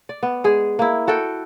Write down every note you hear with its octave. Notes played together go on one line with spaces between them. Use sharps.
D5
B3
G#3 G#4
A#3 E4
F#4 A4 F#5 G5